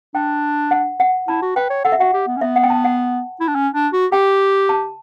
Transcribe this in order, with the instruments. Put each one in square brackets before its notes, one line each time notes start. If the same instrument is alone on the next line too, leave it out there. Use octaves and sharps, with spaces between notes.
[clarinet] D4 [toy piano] G5
[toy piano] F#5
F#5
[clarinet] E4 [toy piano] A5
[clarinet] F#4
[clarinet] B4 [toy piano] G5
[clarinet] C#5
[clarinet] A4 [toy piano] F#5
[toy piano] E5
[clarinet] F#4 [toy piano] F#5
[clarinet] G4
B3
C#4
[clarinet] B3 [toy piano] E5
[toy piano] F#5
G5
A5
F#5
[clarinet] E4
D4
C#4
D4
F#4
[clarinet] G4 [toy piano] G5
[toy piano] A5